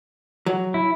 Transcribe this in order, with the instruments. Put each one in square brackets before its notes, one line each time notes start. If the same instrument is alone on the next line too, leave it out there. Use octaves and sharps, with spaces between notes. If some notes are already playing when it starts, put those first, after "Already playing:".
[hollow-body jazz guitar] F#3
[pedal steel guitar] E4